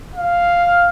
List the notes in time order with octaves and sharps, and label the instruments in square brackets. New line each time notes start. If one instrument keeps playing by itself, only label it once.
[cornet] F5